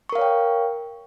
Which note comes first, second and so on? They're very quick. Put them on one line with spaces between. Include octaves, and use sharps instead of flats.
C#6 A#4 F5 C#5 G5